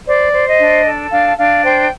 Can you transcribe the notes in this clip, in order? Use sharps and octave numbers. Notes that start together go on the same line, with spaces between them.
C5 D5
C5
D#5
D4
A4
D4 F5
D4 F5
C5 G5